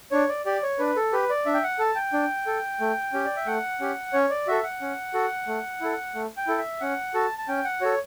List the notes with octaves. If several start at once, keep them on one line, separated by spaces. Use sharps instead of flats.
D4 C#5
D5
G4 D5
C#5
D4 B4
A4
G4 B4
D5
D4 E5
G5
F#5
A4 A5
G5
D4
A4
A3
C#4 G4
D5
E5
A3 F#5
C#4 G4
C#4 C#5
D5
F#4 A4 E5
F#5
C#4
F#4 A4
A3
E4 A4
A3
G5
E4 A4
E5
C#4 F#5
F#4 A4 A5
A5
C#4 G5
F#5
F#4 A4 C#5